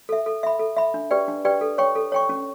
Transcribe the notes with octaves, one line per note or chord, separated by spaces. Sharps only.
A4 E5
A4
E5 B5
A4
E5 B5
D4
G4 B4 D5 G5
D4
G4 B4 D5 G5
A4
C#5 G5 C#6
A4
C#5 G5 C#6
C#4